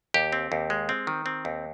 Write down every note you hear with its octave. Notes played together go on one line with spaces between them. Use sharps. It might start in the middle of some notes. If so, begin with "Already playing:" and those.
D#2 G4
C4
D#2
G#3
C4
D#3
C4
D#2